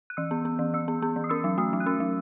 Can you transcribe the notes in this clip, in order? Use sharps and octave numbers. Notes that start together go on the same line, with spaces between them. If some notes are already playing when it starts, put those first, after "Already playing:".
F#6
E3 E6
B3
B3
E3
E3 E6
B3
B3
E3
D#6
C#4 E6
F#3
A3 D#6
F#3
F#6
C#4 E6
F#3